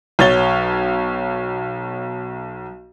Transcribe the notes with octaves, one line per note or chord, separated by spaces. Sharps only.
B1 C#5 A6 G7